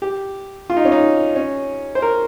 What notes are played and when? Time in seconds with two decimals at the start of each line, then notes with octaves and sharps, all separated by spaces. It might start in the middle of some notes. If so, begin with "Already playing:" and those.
0.02 G4
0.70 F4
0.77 D#4
0.85 C#4
0.92 D#4
1.35 C#4
1.95 C5
2.02 A#4